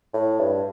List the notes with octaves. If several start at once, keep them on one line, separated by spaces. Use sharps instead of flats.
A2
G2